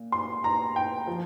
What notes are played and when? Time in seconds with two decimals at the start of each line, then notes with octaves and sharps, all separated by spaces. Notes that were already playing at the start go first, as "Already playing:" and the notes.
Already playing: A#2
0.12 C6
0.44 A#5
0.76 G5
1.07 F3